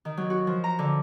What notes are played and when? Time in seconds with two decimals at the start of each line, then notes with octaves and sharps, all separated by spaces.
0.05 D#3
0.17 F#3
0.30 F#4
0.47 F3
0.64 A#5
0.79 D3